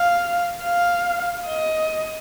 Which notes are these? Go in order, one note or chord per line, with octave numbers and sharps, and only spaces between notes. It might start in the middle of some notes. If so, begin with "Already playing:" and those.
Already playing: F5
F5
D#5